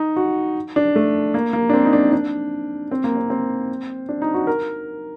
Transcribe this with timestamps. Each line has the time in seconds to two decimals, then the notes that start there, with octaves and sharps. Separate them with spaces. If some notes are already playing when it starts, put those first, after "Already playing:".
Already playing: D#4
0.16 F#4
0.76 D4
0.95 A3
1.34 A#3
1.53 A#3
1.69 D4
1.73 C4
1.85 D#4
1.93 D4
2.13 D4
2.91 C4
3.04 A#3
3.17 C4
3.30 C4
4.09 D4
4.22 D#4
4.34 F#4
4.47 A#4